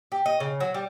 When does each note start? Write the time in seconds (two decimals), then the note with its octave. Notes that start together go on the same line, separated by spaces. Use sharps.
0.12 G4
0.26 D#5
0.40 C#3
0.60 F#3
0.74 G3